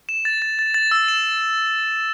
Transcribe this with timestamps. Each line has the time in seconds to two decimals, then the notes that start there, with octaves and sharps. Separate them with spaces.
0.09 E7
0.25 A6
0.42 A6
0.59 A6
0.74 A6
0.91 E6
1.08 E7